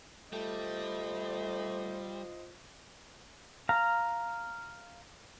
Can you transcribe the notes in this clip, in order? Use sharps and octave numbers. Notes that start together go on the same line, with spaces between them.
G3 A3 F4 C5 D#5
F5 A#5